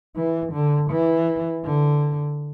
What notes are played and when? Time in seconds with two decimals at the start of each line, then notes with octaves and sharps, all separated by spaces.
0.16 E3
0.53 D3
0.91 E3
1.65 D3